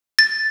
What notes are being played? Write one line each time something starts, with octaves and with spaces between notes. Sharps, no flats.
A6